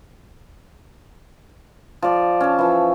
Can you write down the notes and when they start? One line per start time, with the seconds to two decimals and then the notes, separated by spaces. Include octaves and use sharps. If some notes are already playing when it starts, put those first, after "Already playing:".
2.02 F3 D5
2.40 C#4 A5
2.59 E3 F3